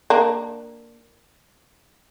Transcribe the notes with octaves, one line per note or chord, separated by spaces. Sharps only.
A#3 D4